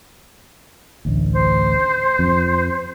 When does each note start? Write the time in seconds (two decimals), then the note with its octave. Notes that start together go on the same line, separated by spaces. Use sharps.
1.05 A1 D2
1.36 C5
2.19 F2